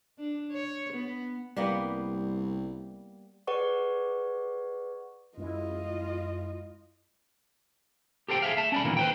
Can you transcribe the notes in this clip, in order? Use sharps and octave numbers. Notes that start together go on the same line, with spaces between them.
D4
C#5
B3
C2 G3 A#3 B3
G#4 B4 D5 F#5 C#6
F#2 G#3 E4 F4 D#5
G4 A4 C5 G5
G#4 E5 F5
E5 A5
C#4 D5 B5
A#2 D#3 E3 A3 A#3
B4 C5 G5